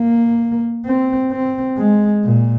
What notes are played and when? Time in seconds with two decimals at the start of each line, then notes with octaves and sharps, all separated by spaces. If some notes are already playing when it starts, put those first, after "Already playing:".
Already playing: A#3
0.86 C4
1.31 C4
1.78 G#3
2.24 A#2